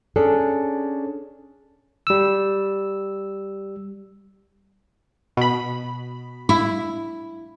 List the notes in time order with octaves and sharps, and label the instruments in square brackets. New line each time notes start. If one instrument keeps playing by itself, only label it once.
[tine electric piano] C#4 D4 G#4 [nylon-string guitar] A4
[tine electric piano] G3 E6
[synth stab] B2 B5
[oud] E4